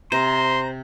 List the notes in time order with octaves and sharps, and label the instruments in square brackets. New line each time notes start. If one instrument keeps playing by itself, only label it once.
[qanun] C3 [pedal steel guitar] C5 [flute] A#5 [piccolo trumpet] C6